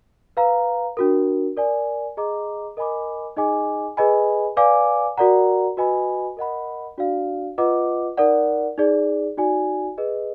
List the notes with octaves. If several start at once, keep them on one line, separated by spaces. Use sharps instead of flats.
B4 F5 A#5
D4 F#4 A#4
A#4 D5 G#5
G#4 D#5 A#5 D6
A#4 D#5 G#5 B5 D6
D#4 G#4 D#5 G#5 D6
G#4 B4 D#5 G#5 B5
B4 D5 F5 G#5 D6
F#4 A#4 D5 F#5 A#5
F#4 B4 D#5 G#5 B5
A#4 D#5 F#5 B5
D4 F#4 D5 F5
F4 B4 D#5 F#5 D6
D#4 A#4 D5 F#5
D#4 G#4 D5
D#4 F#4 D5 G#5
G#4 B4 D#5